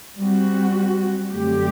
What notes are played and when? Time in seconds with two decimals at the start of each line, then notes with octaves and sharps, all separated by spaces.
0.18 G3 C4 F#4
1.32 F#2 D3 A3 C4 G4